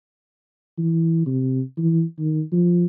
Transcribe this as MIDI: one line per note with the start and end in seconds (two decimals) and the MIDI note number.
0.78 1.22 52
1.26 1.61 48
1.78 2.03 52
2.19 2.42 51
2.52 2.86 53